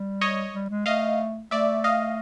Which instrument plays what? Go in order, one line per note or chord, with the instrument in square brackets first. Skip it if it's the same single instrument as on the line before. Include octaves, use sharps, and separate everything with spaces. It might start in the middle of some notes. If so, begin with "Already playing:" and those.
Already playing: [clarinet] G3
[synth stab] C#5 D#5
[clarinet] G3
G#3
[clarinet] A3 [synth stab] D#5 F5
[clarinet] A3 [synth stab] D5 E5
[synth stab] D#5 F5